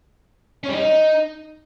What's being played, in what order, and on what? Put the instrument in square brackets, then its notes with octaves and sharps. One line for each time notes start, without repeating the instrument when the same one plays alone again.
[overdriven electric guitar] C#4
G3
D#4